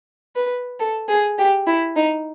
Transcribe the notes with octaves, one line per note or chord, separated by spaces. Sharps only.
B4
A4
G#4
G4
E4
D#4